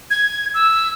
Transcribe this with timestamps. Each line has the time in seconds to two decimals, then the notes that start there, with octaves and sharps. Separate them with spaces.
0.10 G#6
0.54 E6